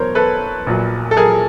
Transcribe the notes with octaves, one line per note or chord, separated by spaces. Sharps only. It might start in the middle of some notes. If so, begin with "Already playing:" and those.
Already playing: E2 B2 F#3 A#4 C5 C#5
A4 B4
A#1 A#2 F#3
A4
G#4 A#4